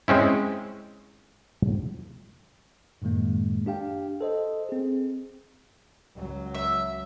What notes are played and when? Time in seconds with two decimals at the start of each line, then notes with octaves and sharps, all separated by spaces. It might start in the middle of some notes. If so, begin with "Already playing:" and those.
0.08 G#3 C4 C#4 E4
3.02 F#2 A2 D#3 G#3 A#3
3.66 D4 G4 F5 G5
4.21 A4 C5 D#5
4.69 C4 G#4
6.14 C#2 F#3
6.55 E5